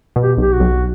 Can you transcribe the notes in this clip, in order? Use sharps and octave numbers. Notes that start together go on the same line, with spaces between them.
B2
G4
B1 G4
F#4
B1